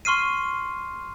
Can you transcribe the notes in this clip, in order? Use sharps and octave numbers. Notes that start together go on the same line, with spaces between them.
C6 C#6 F6 C7 D#7